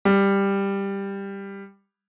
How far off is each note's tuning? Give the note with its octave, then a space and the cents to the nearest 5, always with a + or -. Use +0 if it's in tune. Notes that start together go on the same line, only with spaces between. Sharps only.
G3 +10